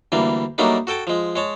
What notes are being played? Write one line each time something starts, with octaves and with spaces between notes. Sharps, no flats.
D2 E3 G3 A#3
F#3 G3 A3 A#3 D4 D#4
F#4 A4 G5 A5
F3 G#3
G#3 C#5 A5